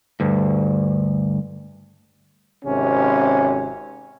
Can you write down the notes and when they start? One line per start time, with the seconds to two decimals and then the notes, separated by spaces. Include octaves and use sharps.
0.20 D2 G2
2.65 G#1 C3 C#4